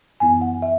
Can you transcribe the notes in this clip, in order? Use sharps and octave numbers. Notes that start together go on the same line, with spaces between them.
F#2 E3 B3 E4 G#5
F#5
E5